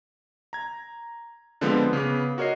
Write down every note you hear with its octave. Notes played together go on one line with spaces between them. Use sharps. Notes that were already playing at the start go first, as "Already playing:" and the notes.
A#5 G#6
D3 F3 G#3 B3 C4
C#3 B3 B4 D6
F#4 A#4 C#5 D#5 C7